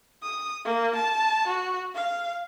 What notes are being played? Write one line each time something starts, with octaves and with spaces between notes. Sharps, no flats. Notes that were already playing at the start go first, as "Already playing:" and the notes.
D#6
A#3
A5
F#4
F5